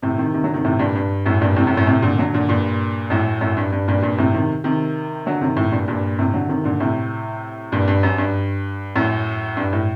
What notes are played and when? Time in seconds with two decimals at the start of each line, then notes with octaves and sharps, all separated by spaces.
0.02 A2 C3
0.18 C3 D#3
0.34 C3 D#3
0.44 D3 F#3
0.54 C3 D#3
0.65 A2 C3
0.79 G2 A#2
0.95 G2
1.26 F#2 A2
1.41 G2 A#2
1.56 A2 C3
1.67 F#2 A2
1.77 F#2 A2
1.87 A2 C3
2.02 A#2 D3
2.18 D3 F#3
2.34 A#2 D3
2.49 G2 A#2
3.10 F#2 A2
3.41 F#2 A2
3.57 G2
3.72 G2
3.88 G2 A#2
4.02 G2 A#2
4.18 A2 C3
4.34 C3 D#3
4.64 C3 D#3
5.26 D3 F#3
5.41 C3 D#3
5.57 A2 C3
5.72 G2 A#2
5.88 G2 A#2
6.19 A2 C3
6.34 D3 F#3
6.49 C3 D#3
6.64 A#2 D3
6.80 A2 C3
7.72 G2 A#2
7.88 G2
8.03 F#2
8.18 G2
8.96 F#2 A2
9.57 G2
9.73 A2